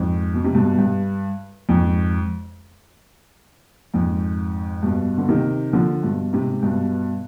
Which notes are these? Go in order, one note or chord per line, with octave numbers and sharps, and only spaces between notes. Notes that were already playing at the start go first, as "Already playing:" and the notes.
Already playing: F2 G#2
B2
C3
G2 B2
G2
F2 G#2
F2 G#2
G2 B2
D3
C3 D#3
D3 F3
G2 B2
G#2 C3
G2 B2